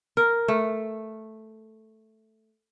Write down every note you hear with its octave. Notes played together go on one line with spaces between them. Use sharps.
A#4
A3